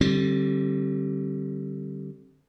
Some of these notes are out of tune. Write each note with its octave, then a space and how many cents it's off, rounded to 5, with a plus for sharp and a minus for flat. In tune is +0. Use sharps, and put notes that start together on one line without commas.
D3 +0 G3 -20 C4 +30